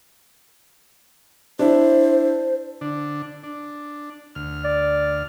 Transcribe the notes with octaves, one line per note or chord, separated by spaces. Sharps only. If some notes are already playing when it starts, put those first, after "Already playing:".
D4 E4 C5
D3 D4
D4
D2 F6
D5